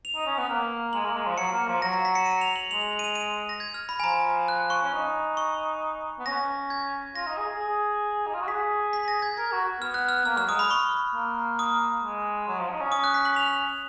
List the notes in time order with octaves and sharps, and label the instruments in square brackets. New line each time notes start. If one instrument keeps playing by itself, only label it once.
[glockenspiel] F7
[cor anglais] D#4
C#4
B3
A#3
[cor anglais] G#3 [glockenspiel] F#7
[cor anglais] A#3
G#3
F3
[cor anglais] F#3 [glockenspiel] C#7
[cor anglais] A#3
F3
[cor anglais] F#3 [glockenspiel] A#6
[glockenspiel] A#6
B6
C#7
D#7
F7
F#7
[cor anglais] G#3 [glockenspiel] F7
[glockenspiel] F#7
F#7
D#7
F7
D#7
A#6
G#6
F6
B5
G#5
[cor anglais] F3 [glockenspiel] A#5
[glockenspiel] F#6
C#6
[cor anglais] C#4
D#4
[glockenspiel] C#6
[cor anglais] B3
[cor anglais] C#4 [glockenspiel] A#6
[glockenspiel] G#6
[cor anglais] F4 [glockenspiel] A#6
[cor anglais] D#4
G#4
G#4
G#4
D#4
F4
F#4
[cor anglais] G#4 [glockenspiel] B6
[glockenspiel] B6
A#6
G#6
[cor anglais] A#4 [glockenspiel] G#6
[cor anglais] F#4
[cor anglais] B3 [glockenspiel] F6
[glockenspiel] F#6
F6
[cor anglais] A#3 [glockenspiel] F6
[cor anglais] F#3 [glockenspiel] F6
[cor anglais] G#3 [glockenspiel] D#6
[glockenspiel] B5
C#6
[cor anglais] A#3
[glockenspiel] D#6
[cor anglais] G#3
F#3
F3
D#4
C#4
[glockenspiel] D#6
F#6
B6
F#7
F7